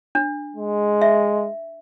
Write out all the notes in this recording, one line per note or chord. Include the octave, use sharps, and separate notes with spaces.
D4
G#3
E5